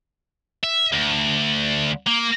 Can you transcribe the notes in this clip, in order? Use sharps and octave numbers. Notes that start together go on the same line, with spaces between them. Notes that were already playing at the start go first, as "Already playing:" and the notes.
E5
D2
A#3